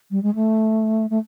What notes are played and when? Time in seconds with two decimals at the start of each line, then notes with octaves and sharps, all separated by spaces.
0.11 G3
0.23 G#3
0.35 A3
1.10 A3